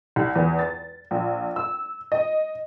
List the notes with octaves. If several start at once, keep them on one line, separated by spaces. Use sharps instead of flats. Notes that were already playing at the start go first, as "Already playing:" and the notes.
C2
E2
A6
A#1
E6
D#5